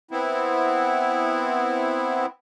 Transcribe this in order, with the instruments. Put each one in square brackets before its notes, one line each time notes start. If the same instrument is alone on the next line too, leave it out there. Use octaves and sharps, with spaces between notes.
[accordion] B3 C4 E4